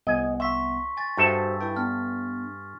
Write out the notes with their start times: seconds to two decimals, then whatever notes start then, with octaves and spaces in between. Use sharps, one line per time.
0.07 C2 B3 D#5 F#5 G#5
0.40 E5 C6 C#6 B6
0.97 G#5 A6
1.17 G2 F#4 A4 C5 E5
1.61 E4 B4 G5
1.76 B3 D4 F6